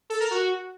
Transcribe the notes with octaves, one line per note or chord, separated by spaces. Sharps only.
A4
A#4
F#4